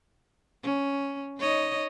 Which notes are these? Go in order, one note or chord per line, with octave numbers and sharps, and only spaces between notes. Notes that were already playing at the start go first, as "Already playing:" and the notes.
C#4
D#4 C#5 D#5